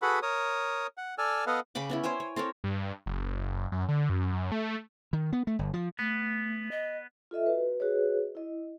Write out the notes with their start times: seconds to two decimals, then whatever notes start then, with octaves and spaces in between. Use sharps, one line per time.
0.02 F#4 G#4 A4 B4 F#5 B5
0.22 A#4 C#5 D#6
0.98 F#5
1.18 A4 D5 G#5 E6 F6
1.47 B3 A4 B4 D#5 F5 F#5
1.75 C#3 G5 B5 D6
1.90 B3 C#4 E4
2.04 C5 C#5 G5 G#5
2.20 C#5
2.36 C4 A4 A#4 C#5
2.64 G2
3.06 F#1
3.72 F#2
3.89 D3
4.09 F#2
4.32 F#2
4.52 A3
5.13 D#3
5.33 B3
5.47 A3
5.59 G1
5.74 F3
5.99 A3 B3
6.71 D#5
7.31 F4 A4 D#5 E5
7.46 F#4 B4
7.79 F#4 G#4 B4 C#5 D#5
8.35 E4 D#5